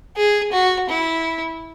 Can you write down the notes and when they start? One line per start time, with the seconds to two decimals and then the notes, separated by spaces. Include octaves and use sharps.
0.16 G#4
0.52 F#4
0.89 E4